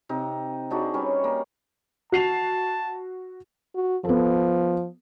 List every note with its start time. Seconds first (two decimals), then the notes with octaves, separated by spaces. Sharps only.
0.09 C3 D#4
0.70 D4 D#4 F#4 G#4
0.94 G3 C#4 B4 C#5
1.24 A#3
2.12 F#4 A5 C7 F7
3.75 F#4
4.05 F3 B3 A4